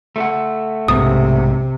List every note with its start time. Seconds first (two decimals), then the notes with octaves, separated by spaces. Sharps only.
0.16 A3 A4 F#5
0.88 B1 G#2 C3 D#6